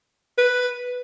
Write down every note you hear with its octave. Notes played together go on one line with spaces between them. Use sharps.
B4